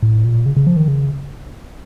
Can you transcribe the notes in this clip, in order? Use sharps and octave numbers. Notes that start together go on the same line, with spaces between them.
A2
A#2
C#3
C#3
F3
D#3
C#3